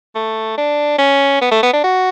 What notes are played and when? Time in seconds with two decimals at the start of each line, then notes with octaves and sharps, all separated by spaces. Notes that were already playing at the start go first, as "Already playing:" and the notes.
0.15 A3
0.57 D4
0.99 C#4
1.42 B3
1.51 A3
1.63 B3
1.73 D4
1.84 F#4